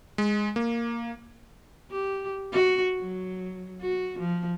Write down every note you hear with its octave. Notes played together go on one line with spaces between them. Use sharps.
G#3
A#3
G4
F#4
F#3
F#4
F3